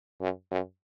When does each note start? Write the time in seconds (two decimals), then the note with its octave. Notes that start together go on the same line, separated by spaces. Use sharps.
0.21 F#2
0.51 F#2